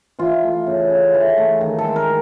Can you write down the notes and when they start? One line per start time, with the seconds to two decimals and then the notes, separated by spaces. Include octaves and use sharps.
0.19 E3 F4
0.43 A3
0.67 C#3
0.90 C#3
1.14 E3
1.37 A3
1.61 D#3
1.79 A4
1.84 G#3
1.96 A#4